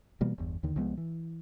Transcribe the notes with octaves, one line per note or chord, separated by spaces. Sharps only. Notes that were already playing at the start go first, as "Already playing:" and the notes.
B2 E3 G3 A#3
G1 E2
D#2 D3 D#3
C2 F3 G#3 B3
E3